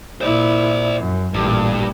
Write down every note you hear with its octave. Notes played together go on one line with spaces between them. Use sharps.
A#2 E4 C5 D5
F#2
A1 G2 A#2